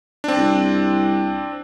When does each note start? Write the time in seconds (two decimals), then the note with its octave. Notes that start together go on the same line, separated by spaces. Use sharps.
0.24 C4 D4
0.37 C2